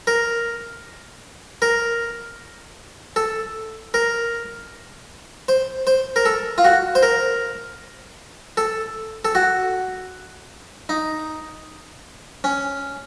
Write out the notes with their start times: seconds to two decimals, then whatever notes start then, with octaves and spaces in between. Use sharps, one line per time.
0.07 A#4
1.62 A#4
3.16 A4
3.94 A#4
5.48 C5
5.87 C5
6.16 A#4
6.26 A4
6.58 F4
6.65 F#4
6.95 C5
7.03 A#4
8.57 A4
9.25 A4
9.35 F#4
10.89 D#4
12.44 C#4